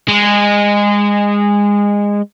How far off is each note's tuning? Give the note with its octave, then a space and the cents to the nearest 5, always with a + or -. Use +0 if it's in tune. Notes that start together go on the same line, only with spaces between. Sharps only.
G#3 -20